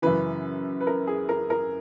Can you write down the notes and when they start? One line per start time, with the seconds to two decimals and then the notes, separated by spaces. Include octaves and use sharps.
0.02 F#2 C#3 E3 B4
0.81 B4
0.87 A#4
1.07 G#4
1.29 A#4
1.50 A#4